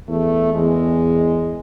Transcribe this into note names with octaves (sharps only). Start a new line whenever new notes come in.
E2 A3
E2 G#3